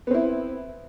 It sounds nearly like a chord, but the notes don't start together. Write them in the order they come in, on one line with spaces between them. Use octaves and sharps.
B3 C4 E4